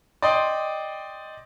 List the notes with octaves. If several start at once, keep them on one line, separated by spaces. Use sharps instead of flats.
D5 D#5 G5 C6 D#6